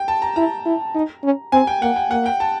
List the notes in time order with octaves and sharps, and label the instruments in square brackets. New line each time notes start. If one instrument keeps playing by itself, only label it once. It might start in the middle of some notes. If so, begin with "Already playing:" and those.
Already playing: [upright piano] G5
A5
A#5
[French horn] E4 [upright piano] A#5
[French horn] E4
D#4
C#4
[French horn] C4 [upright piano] G#5
[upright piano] G5
[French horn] A#3 [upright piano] F#5
[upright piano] G5
[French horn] A#3 [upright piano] F#5
[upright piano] G5
A5